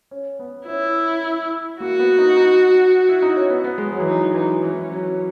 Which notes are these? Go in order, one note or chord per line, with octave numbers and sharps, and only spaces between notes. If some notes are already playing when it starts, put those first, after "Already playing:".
C#4
B3
C#4 E4
A#3 F#4
B3
D#4
D#4
E4
D#4
C#4
B3
B3
G#3
F#3
E3
F#3 D#4
E3 D#4
E3 C#4
F#3